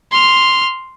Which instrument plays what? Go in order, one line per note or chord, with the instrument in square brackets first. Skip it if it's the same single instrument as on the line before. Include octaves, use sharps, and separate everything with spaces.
[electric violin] C6 F6